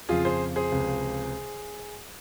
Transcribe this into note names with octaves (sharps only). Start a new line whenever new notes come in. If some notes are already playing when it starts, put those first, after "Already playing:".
F2 C#3 F3 F4 G#4
G#4 C5
G#4 C5
C#2 C3 F3